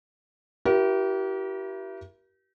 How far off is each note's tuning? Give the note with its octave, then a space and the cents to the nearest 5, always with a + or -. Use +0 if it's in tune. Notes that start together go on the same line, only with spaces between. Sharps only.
E4 +25 G4 -35 A#4 +35